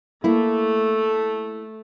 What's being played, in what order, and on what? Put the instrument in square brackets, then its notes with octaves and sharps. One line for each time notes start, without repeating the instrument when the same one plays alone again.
[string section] A3 [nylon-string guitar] A#3 E4